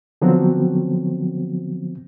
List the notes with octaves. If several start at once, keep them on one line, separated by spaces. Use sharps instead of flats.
D3 F3 F#3 B3 C4 F#4